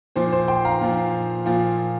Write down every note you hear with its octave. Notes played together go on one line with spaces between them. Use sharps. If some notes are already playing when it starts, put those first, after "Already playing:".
A#2 F3 C5
C5
G5 C6
F5 A#5
A#2 F3
A#2 F3